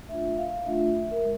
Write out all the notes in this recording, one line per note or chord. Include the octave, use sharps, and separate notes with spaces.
A3 D4 F4 E5
F5
A3 D4 F4 E5
A#4
G#3